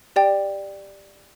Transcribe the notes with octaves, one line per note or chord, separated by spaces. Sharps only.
G4 D5 G5